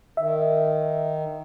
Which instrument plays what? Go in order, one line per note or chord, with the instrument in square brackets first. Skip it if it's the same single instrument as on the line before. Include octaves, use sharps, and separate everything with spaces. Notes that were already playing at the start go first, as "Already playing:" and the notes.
[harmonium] D#3 [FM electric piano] E5